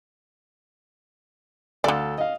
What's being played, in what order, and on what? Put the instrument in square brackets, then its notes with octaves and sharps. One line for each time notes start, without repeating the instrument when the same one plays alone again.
[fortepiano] D2 A4 F5 [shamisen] D3 D5
[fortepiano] D#5 F5